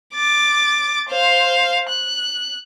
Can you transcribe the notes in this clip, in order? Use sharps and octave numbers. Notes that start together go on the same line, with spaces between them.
D6 A6
C5 F5
F#6